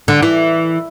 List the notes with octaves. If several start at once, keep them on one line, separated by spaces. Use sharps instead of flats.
D3
E3